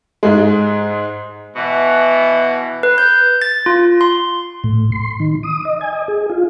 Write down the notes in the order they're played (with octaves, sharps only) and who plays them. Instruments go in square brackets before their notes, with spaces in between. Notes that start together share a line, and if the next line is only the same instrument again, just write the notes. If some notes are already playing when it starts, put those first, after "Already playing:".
[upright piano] G#2 G#3
[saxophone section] B2 E3
[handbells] B4
G6
A6
F4
C6
[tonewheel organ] A2
C6
D#3
D#6
D#5
G#5
D#5
G#4
F4